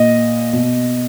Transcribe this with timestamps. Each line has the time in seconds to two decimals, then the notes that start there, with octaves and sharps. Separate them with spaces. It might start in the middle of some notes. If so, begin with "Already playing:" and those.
Already playing: A#2 D#5
0.53 B2